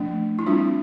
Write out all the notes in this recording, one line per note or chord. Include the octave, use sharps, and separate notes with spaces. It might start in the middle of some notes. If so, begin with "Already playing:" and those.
Already playing: F3 A3 D4
E4
G3 C4 D4 F4